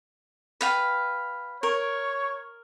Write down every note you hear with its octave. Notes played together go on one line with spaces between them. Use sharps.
B4 F5 G5
A#4 C#5